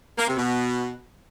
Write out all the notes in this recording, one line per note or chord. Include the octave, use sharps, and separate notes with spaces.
A#3
C3
B2